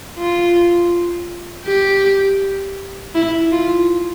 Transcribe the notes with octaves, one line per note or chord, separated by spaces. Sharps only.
F4
G4
E4
F4